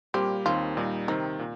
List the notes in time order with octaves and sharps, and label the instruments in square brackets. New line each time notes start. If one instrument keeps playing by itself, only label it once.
[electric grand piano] A#2 G3 A#3 G4 [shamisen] C4
[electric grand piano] D#2 D#3 C4 [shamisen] F4
[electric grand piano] A#2 G3 D#4
[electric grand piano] C3 D#3 C4 [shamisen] D#4
[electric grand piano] A#2